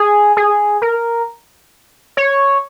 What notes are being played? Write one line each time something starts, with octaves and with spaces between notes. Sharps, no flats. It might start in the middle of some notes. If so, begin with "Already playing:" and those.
Already playing: G#4
G#4
A#4
C#5